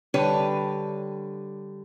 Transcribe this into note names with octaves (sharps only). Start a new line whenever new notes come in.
D3 G3 B4 C#5